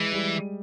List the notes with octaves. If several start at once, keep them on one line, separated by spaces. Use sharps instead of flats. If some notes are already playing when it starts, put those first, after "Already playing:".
Already playing: E3 G#3
G3